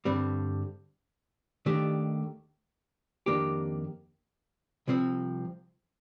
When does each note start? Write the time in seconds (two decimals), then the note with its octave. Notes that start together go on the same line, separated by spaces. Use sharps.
0.05 G2 D3 G3 C4
1.66 D#2 D#3 A3 D4 G4
3.26 F2 D#3 A#3 D4 G4
4.88 C2 C3 F3 C4